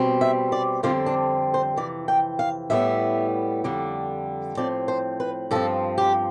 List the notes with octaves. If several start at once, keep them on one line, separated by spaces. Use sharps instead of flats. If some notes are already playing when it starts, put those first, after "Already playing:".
Already playing: B2 G3 C4
E5
D5
F2 D3 G3 C4 F4
D4
C5
F2 C3 E3 D5
G5
F5
A2 G3 B3 E5
F2 D3 G3
A2 F3 C4 D5
C5
B4
G2 F3 C4 A4
G4